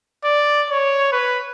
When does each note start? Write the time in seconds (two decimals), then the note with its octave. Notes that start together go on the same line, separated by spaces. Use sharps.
0.24 D5
0.70 C#5
1.12 B4